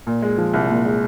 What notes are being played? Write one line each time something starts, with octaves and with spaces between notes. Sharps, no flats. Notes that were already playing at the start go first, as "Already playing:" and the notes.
A#2
G#3
F3
C2
A#2
G#3